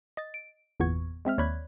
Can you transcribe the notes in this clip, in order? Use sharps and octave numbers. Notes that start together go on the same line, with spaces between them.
D#5 A6
D7
G1 E2 A#2 B3 C#6 G#6
G#3 C4 E5 F6
D#2 C#5 D5 B5 F#6 G#6